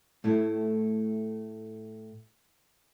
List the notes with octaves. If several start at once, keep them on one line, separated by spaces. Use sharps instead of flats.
A2 A3 E4